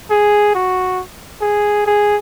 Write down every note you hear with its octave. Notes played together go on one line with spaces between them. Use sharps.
G#4
F#4
G#4
G#4